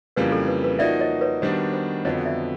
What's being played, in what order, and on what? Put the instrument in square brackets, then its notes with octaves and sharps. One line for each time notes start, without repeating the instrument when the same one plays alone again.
[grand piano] F2 C#3 E3 G3 A#3 [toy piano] B4
[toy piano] A4
B4
B4
[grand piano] F3 A#3 D#4 F#4 [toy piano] D5 E5
[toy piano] C#5 D#5
B4 C#5
[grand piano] D#3 G3 B3 D4 F#4 [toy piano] C5
[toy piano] C5
[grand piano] F2 D3 F#3 B3 [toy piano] C#5 D#5
[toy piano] D5 E5